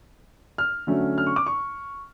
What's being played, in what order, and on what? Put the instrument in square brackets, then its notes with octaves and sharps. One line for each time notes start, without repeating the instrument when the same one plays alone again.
[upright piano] F6
D3 F#3 A3 C#4
F6
C#6
D6
C#6